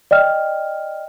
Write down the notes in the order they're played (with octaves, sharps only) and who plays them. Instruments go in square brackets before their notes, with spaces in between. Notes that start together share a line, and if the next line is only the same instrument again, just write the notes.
[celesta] D5 D#5 G5 F6